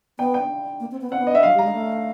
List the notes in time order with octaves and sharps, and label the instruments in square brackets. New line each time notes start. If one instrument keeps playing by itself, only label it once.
[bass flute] B3 [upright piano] G5
[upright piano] G5
[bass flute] A#3
C4
B3
[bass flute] C4 [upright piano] F#5
[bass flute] B3
[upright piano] D#5
E5
[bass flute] F#3 [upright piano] F5
[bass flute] G3 [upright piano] A#5
[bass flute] G#3
A3